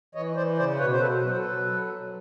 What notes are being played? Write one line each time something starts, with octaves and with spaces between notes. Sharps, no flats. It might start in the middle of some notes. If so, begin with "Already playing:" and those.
E3 C#5 D#5
E3 C5 D5
C#3 C5 D5
B2 B4 C#5
C5
B2 A4 B4
F#3 B4
C5
A4 B4
B2
F#3